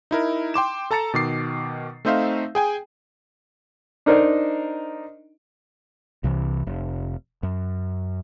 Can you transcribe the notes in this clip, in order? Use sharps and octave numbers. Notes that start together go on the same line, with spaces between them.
D#4 E4 A#4
G5 C6 D6 E7
A4 A5 A#5 A6 C#7
B2 D#3 D6 C7
A3 C4 D#4 C5 E5 F5
G#4 G5 G#5
D4 D#4 A#4 C5 D5
C2 C3 D#3 E3
F1
F#2